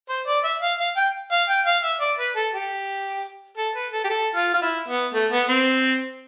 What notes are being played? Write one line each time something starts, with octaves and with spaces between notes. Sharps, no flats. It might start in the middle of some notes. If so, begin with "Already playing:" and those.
C5
D5
E5
F5
F5
G5
F5
G5
F5
E5
D5
B4
A4
G4
A4
B4
A4
G4
A4
F4
F4
E4
B3
A3
B3
C4